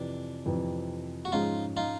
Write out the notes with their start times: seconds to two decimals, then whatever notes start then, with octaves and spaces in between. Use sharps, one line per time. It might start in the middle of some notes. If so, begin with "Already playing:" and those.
Already playing: F2 C3 E3 D4
0.45 F2 C3 E3
1.25 F#4
1.32 G#2 F3 G#3 C#4 D#4 F4
1.77 D#4 F4